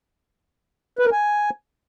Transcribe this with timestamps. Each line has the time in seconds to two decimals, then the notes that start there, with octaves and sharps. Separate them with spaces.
0.99 B4
1.06 A#4
1.12 G#5